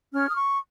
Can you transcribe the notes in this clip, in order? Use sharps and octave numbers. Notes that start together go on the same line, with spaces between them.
C#4 F6
D#6
C#6